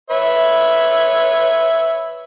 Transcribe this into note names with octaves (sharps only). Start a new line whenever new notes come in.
B4 C#5 E5